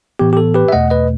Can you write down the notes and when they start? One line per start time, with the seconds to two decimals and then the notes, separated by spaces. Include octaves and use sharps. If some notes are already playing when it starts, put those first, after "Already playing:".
0.19 A2 E3 B3 G4
0.33 G4
0.37 A4
0.54 G4 B4
0.69 E5
0.72 E2 B2 A3 D#5 F#5
0.90 B4 D#5